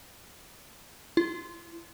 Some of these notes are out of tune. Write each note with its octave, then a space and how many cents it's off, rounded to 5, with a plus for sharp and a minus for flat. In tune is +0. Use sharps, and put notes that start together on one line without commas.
E4 +30